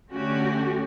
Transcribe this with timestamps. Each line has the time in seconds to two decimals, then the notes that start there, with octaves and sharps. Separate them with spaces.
0.12 D3 A3 C#4 F#4 G4